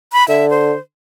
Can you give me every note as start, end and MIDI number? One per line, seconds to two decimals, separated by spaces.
0.13 0.27 83
0.28 0.74 50
0.28 0.48 76
0.50 0.79 72